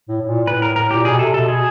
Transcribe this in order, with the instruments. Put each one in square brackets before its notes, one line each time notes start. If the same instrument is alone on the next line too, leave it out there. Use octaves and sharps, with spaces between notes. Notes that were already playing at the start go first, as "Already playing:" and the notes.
[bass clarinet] A2
A2
A#2
[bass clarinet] A2 [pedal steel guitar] B4
[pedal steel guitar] A#4
A#4
[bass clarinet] A#2 [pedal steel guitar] G4
[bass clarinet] B2 [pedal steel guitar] G#4
[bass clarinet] C3 [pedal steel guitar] A4
[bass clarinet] B2 [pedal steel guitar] A4
[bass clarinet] B2 [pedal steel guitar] G#4